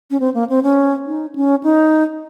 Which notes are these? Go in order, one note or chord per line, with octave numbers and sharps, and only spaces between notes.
C#4
C4
A#3
C4
C#4
D#4
C#4
D#4